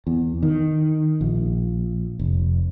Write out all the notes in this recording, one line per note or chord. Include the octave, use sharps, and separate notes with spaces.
E2
D#3
A#1
F1